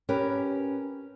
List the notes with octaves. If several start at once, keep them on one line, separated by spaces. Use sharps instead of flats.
C#4 G4 A#4 B4